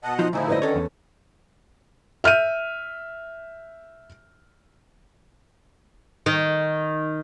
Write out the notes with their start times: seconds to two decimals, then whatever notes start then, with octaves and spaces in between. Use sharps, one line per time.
0.04 B2 D#5 F#5 A5
0.19 F3 D#4 F4
0.33 D2 A2 C#3 F3 D#4 E4 G#5
0.48 B4 C5 D5 D#5
0.62 D3 D#3 C#4 A4 C#5
0.75 E2
2.24 E5 F6 G6 D#7
6.26 D#3